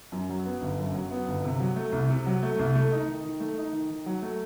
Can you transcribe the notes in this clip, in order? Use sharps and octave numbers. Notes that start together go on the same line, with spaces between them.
F#2
F#3
B3
G1
F#2
F#3
B3
G1
C3
F#3
A3
C2
C3
F#3
A3
C2
A3
D#4
D#3
D#3
A3
D#4
D#3
D#3
F#3
A3